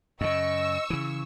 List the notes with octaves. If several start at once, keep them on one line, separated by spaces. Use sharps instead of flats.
F#2 C#3 D#5 C#6 E6
C#3 E3